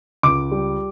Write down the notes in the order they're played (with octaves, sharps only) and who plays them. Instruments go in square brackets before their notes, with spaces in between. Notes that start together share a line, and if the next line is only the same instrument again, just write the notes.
[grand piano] C#2 D6
G3